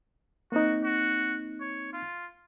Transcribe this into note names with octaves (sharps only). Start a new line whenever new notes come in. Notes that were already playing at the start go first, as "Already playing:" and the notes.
A#3 C4 D#4 F#4
F#4
C#5
F4